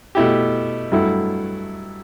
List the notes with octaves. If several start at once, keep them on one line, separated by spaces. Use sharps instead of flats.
B2 A3 E4 G4
G2 F#3 A3 E4 A4